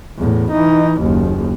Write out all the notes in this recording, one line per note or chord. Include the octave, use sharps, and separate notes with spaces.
E2 A2
E3 D#4
F#1 D#2